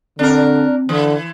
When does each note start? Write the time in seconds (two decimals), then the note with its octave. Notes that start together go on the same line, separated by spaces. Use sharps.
0.19 D3 C4 D4 A#4
0.89 D3 E3